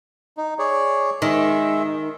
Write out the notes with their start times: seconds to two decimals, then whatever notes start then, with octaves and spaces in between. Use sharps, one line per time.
0.37 D#4
0.59 G#4 C#5 D5
1.22 D#3 G#3 E5